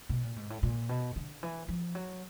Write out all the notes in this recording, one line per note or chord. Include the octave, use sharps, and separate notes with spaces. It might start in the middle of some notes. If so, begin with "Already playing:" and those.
B2
A#2
G#2
A2
A#2
B2
D3
E3
F3
F#3